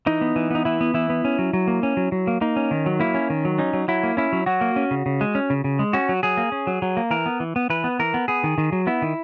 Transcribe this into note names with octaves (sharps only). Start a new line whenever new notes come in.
E3 D#4
B3
E3
B3 D#4
E3 E4
B3
E3 E4
B3
C#4
F#3
F#3
A#3
C#4
F#3
F#3
A#3
A#3 D#4
C#4
D#3
F#3
A#3 E4
C#4
D#3
F#3
C#4 D#4
F#3
F#3 E4
A#3
C#4 E4
F#3
F#3 F#4
A#3
C#4
C#3
C#3
G#3
C#4
C#3
C#3
G#3
C#4 F#4
F#3
F#3 G#4
A#3
C#4
F#3
F#3
A#3
E3 A#4
B3
E3
B3
E3 B4
B3
E3 A#4
B3
B3 G#4
D#3
D#3
F#3
B3 E4
D#3